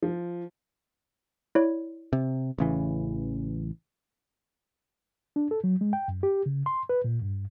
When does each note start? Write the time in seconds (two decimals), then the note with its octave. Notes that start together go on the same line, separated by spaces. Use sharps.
0.02 F3
1.55 E4 C#5 D5
2.13 C3
2.58 A1 C#3 E3
5.36 D4
5.51 A4
5.64 F#3
5.81 G#3
5.93 G5
6.08 F#2
6.23 G4
6.46 C#3
6.66 C6
6.89 B4
7.04 A#2
7.22 G2